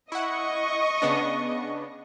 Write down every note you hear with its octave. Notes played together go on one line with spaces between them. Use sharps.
E4 D#5 F#5 C#6
C#3 B3 D4